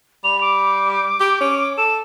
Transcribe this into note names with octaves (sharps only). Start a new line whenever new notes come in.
G3 F7
D6
G4
C#4
A4 E7